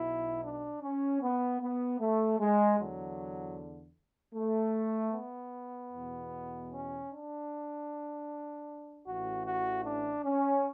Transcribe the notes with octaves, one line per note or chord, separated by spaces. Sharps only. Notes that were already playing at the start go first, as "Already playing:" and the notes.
Already playing: B1 B2 E4
D4
C#4
B3
B3
A3
G#3
E2 D3 F#3
A3
B3
E2 B2
C#4
D4
A1 A2 E3 F#4
F#4
D4
C#4